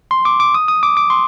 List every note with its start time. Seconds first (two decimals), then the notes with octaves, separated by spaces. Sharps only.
0.11 C6
0.25 D6
0.40 D6
0.54 D#6
0.68 D#6
0.83 D6
0.97 D6
1.10 C6